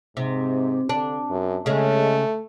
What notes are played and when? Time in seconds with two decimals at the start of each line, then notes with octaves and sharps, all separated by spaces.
0.17 G#2 C3
0.89 D3 D4
1.30 F#2
1.66 C#3 G#3 A3